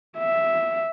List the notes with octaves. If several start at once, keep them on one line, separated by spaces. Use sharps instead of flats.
E5